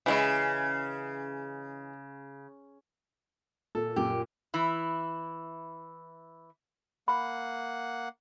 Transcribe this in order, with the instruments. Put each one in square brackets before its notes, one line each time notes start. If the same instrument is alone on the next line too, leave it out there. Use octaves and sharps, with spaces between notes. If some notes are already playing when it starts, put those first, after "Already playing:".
[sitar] C#3 [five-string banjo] E3 G#3 E4
[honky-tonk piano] A#2 [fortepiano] A4
[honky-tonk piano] F#2 A#2 [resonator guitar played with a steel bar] G4
[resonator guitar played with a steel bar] E3 E4
[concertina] A#3 F#5 [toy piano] B5